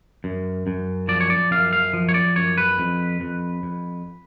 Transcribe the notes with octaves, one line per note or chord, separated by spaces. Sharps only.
F#2
F#2
F3 D5
C#5
D5
F#2 F5
F5
F3
C#5
D5
F#2 C#5
B4
F2
F2
F2